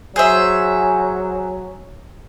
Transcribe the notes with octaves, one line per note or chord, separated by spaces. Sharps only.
F#3 G#4 C5 E5